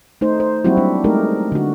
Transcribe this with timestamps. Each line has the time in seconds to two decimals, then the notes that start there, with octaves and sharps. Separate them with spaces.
0.21 A3 D#4 C5
0.40 C5
0.65 F#3 G3 A#3 C4 E4 F#4
0.77 G3 D4
1.04 G#3 A3 D#4 G4 A#4
1.52 D3 F#4